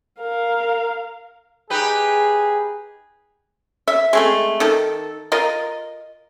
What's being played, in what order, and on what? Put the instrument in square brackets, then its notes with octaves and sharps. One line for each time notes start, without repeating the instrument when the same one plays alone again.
[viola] A#4 F5
[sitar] D#4 G4 B4 [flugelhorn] G#4
[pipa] E5
G#3 A3 C4
D#3 A4
F4 A#4 D#5